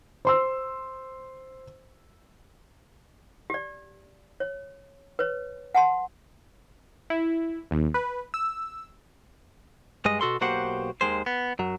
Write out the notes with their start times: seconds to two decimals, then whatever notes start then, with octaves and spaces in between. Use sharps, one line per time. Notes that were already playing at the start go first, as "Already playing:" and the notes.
0.25 C5 C6 E6
3.50 G4 D5
4.40 C#5
5.19 B4 C#5
5.75 F#5 A5 C6
7.10 E4
7.71 D#2
7.94 B4
8.34 E6
10.05 G2 G#3 D#5
10.21 B2 F#4 A4 C6
10.41 B1 A#3 F#4 G4 C5 F#5
11.01 D#2 D#3 G#3 C5
11.26 B3
11.59 F#2 F#3